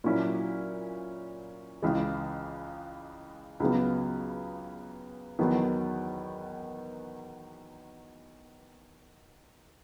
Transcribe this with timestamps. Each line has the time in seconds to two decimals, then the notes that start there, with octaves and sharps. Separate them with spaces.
0.04 A#2 F#3 C#4 E4
1.82 C#2 C#3 E3 G#3
3.60 C#2 C#3 F#3 B3
5.39 E2 D#3 F#3 B3